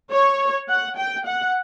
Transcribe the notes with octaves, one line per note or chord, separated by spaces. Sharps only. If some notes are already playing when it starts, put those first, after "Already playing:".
C#5
F#5
G5
F#5